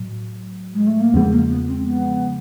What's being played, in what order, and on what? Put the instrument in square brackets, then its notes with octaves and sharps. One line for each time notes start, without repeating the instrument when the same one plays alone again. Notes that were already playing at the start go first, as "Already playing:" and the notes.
Already playing: [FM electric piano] A2 F#3
[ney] G#3
A3
A#3
[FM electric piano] E2 C#3 F3 G#3 [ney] B3
[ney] A#3
B3
C4
B3